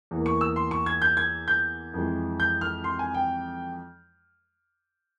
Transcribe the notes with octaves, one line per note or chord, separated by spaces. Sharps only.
E2 E3 A#3
C#6
E6
C6
C#6
G#6
G6
G#6
G6
F2 E3 G#3
G6
F6
C6
G#5
G5